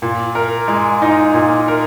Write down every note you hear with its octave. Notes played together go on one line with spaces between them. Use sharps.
A#2
A#4
G#3
D#4
A#2
A#4